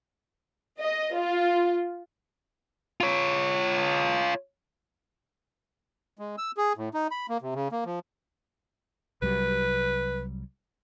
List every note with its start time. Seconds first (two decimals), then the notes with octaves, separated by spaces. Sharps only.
0.80 D#5
1.16 F4
3.01 F4 C#5
6.19 G#3
6.38 E6
6.57 G#4
6.77 A2
6.94 D#4
7.11 B5
7.29 A#3
7.42 C3
7.55 C#3
7.72 A#3
7.85 F3
9.22 C2 F#3 G3 B4